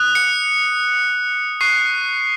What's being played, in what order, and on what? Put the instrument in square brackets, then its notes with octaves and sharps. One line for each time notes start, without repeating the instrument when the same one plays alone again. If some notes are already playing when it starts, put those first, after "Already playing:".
Already playing: [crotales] D#6 F#6
C#7
C#6 F#6 C7